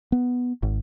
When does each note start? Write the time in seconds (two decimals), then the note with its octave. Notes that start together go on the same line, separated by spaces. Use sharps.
0.12 B3
0.63 G#1